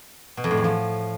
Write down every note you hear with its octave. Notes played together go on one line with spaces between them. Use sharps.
B2
F2
A2
E2
F3